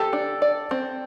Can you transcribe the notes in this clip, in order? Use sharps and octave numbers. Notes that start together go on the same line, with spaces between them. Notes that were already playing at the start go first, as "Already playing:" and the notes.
Already playing: C4 G4 A4
D4
D5
C4